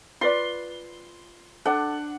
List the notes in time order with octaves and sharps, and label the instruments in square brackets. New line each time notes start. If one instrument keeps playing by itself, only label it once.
[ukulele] F4 B4 D5 [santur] C6
[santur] D4 F#5 [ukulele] A4